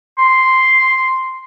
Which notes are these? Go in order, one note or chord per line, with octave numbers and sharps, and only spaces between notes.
C6